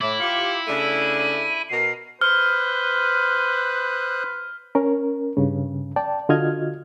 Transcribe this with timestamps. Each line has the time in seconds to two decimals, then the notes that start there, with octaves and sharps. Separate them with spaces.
0.01 A2 E4 D6
0.20 F4 G4 C#7
0.67 C#3 A3 D4 D#7
1.69 B2 A#4 C7
2.21 B4 C5 D#6 F6 F#6
4.75 C#4 A#4
5.37 G2 C#3
5.96 D5 G5 A5
6.29 D3 F4 F#4 D#5 F6 G#6